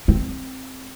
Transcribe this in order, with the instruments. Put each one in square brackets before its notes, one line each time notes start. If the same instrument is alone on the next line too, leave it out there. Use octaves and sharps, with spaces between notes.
[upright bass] C4